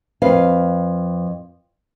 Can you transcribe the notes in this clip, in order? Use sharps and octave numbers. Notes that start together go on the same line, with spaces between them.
F2 B4 F5